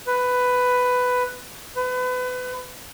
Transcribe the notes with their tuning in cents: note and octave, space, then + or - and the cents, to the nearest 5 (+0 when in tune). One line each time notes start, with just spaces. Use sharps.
B4 +10
B4 +30